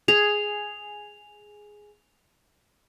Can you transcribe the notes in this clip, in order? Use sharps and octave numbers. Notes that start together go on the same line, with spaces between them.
G#4 F7